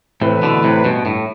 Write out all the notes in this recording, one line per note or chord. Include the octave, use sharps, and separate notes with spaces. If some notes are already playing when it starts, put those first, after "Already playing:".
A2 C3 E3 A3 E4 B4
B2 D3
A2 C3
G2 B2
A2